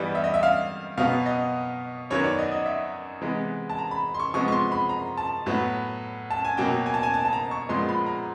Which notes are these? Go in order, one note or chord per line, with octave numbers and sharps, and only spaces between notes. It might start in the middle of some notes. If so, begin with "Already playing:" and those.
Already playing: G2 E3 G3 B3 D#5
E5
D#5
E5
F5
B2 F#3 B3 F5
D#5
F#2 D#3 F#3 B3 C#5
D5
D#5
D#5
E5
C3 E3 G#3 B3
A5
A#5
B5
C6
C#6
C3 F3 G#3 B3 C#6
C#6
C6
B5
A#5
A5
A2 F#3 B3
A5
G#5
B2 F#3 A#3 G5
G#5
A5
G#5
A5
A5
A#5
C#6
A#2 F3 G#3 B3 C6
B5
A#5